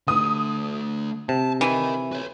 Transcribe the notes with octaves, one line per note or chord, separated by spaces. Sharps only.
D3 A3 D#6
C3 A5
E3 A#4 D#5
B4 C#5